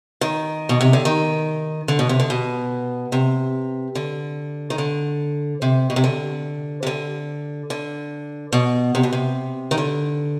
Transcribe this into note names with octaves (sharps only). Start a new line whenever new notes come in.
D#3
B2
C3
D3
D#3
D3
B2
C3
D3
B2
C3
D3
D#3
D3
C3
B2
C3
D3
C3
D3
D3
B2
C3
B2
C3
D#3
D3